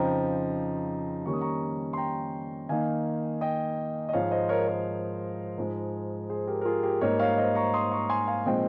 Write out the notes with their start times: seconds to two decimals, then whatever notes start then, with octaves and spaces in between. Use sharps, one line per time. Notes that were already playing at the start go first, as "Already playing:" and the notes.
Already playing: F2 C#3 F3 C4 D#4 G5 A#5
1.26 D#3 G3 A#3 C#4 C#6
1.33 D#6
1.41 A#5 C#6
1.93 C6
1.97 G5 A#5
2.69 D#3 A#3 D#4 F5 G#5
3.41 D#5 G5
4.09 D#5
4.13 G#2 F3 G#3 C#5 F5
4.31 C5 D#5
4.49 A#4 C#5
4.67 A#4 C#5
5.58 G#2 F3 G#3
6.29 G#4 C5
6.47 G4 A#4
6.61 A#4
6.65 F4 G#4
6.83 G4 A#4
7.01 G#2 G3 A#3 D#4 A#4 C#5
7.20 C#5 F5
7.38 C5 D#5
7.55 A#5 C#6
7.74 C6 D#6
7.91 A#5 C#6
8.09 G#5 C6
8.27 F5 G#5
8.45 A#2 F3 G#3 C4 D#4 D#5 G5